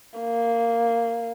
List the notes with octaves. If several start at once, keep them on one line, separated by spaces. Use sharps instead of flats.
A#3